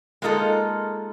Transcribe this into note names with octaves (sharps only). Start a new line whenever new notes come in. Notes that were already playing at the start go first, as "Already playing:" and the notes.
G#3 A#3 D#4 F4 A4